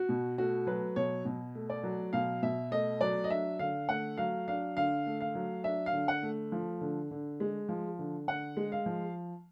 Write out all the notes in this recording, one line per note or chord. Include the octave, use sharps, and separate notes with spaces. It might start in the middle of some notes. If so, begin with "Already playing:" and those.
Already playing: F#4
B2
A3 F#4
F#3 B4
B2 C#5
B2
A3
D5
F#3
B2 F5
B2 E5
A3 D#5
F#3 D5
D#5
D4 E5
D3 F5
A3 F#5
F#3 F5
D4 F5
D3 F5
A3
F5
F#3
D4 E5
F5
D3
F#5
A3
F3
D3
D3
G#3
F3
D3
D3 F#5
G#3
F5
F3